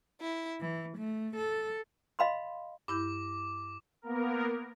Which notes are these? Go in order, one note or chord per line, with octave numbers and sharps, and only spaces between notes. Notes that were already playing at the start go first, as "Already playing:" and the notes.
E4
E3
A3
A4
D#5 F5 B5 C6
G2 E4 D6 G6
A#3 B3 A#4